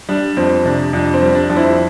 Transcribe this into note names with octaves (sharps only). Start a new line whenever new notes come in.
G3 D4
F2 C4
C3 D4
F2 D4
C4
G3
D4
F2 D4
C4 E4